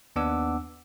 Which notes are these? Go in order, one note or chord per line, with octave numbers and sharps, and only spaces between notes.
D#2 B3 D4 F#5 D6 E6